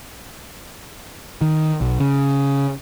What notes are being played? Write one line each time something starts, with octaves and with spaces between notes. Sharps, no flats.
D#3
B1
C#3